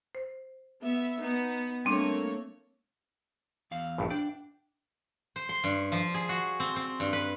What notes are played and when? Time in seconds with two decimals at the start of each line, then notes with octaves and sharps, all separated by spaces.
0.15 C5
0.82 B3 E5
1.20 B3 D#4
1.85 G3 A3 A#3 C4 D4 C#5
3.71 E2 F5
3.98 A#1 G2
4.10 D4 G5
5.36 C5
5.49 C6
5.64 G2
5.92 F3
6.14 G#4
6.29 F#4
6.60 C4
6.76 C4
7.00 G2
7.13 B4